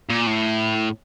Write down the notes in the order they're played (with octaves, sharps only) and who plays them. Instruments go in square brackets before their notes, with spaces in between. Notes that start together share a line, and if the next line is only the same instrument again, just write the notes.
[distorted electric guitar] A#2
A2